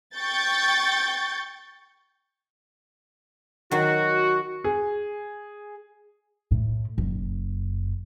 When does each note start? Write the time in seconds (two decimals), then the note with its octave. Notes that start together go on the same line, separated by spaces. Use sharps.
0.17 G5 C#6 G6 A6
3.71 D#3 F#3 F#4
4.64 G#4
6.51 A2
6.98 F#1